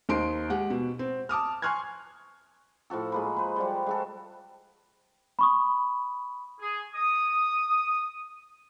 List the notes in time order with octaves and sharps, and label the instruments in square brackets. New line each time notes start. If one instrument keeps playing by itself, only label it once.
[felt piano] D#2 D#4 C5 C6 D7
G#3 G4 F#5
B2
C4
A5 D6 D#6 F6
G#5 C6 C#6 F6 F#6 G#6
[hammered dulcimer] A2 F3 F#4 A4
G#3 A#3 B4
B4 C5
F3 G3 F#4
G#3 F#4 A4
[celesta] B5 C#6 D#6
[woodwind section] G#4
D#6